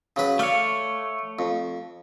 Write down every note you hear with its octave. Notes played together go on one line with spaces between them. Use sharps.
C#3 F#3 B4
A3 C#5 D5 F5
F2